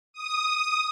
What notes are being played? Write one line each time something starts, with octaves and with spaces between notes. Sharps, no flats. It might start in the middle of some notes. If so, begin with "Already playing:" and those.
D#6